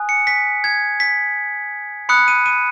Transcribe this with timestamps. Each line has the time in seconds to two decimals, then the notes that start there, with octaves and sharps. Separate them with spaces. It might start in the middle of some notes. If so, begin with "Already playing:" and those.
Already playing: G#5 D#6 F#6
0.09 C#7
0.27 B6
0.64 G#6
1.00 B6
2.09 B5 D#6 F#6 C#7
2.28 D#7
2.46 D#7